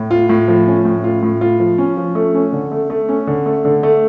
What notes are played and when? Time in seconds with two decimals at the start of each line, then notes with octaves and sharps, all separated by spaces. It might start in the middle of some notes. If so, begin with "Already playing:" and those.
Already playing: A2
0.11 F4
0.29 A2
0.48 F3
0.67 C#4
0.85 A2
1.04 F4
1.23 A2
1.41 F4
1.60 F3
1.78 C#4
1.97 F3
2.15 A3
2.35 C#4
2.53 D3
2.72 A3
2.90 A3
3.09 C#4
3.27 D3
3.46 A3
3.65 D3
3.83 A3